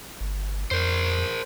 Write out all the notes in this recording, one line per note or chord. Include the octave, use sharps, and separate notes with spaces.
G1
F2 A#4 C5